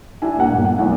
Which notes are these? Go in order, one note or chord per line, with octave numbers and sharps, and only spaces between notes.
D4 E4 G#5
D#1 A#3 F#5
G1
F#5
B1 E2